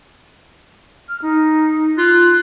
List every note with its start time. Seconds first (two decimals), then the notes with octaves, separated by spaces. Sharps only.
1.09 F6
1.22 D#4
1.98 F4 F#6